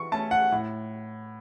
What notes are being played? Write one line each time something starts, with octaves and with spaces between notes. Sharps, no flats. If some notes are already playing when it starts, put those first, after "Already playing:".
Already playing: E3 C#6
A3 C#4 A5
F#5
A2